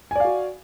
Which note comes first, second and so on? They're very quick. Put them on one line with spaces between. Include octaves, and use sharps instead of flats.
G#5 D5 F5 F#4